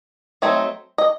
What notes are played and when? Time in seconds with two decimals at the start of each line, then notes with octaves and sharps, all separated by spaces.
0.42 F#3 A3 C4 D#4
0.98 D#5